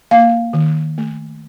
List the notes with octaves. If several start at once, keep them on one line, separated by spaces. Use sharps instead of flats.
A#3 F5
D#3
A3